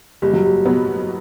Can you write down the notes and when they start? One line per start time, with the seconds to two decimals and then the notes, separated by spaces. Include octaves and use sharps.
0.22 F#1 G3
0.33 F#3
0.45 G3
0.65 B2 F#3 B3